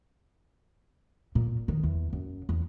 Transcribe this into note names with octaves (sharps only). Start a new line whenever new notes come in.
A#2
D#3
E2
F#2
E2